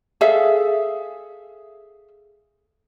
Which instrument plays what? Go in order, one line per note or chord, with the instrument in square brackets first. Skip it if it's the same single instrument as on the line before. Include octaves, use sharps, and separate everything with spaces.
[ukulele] G#4 A4 E5 F5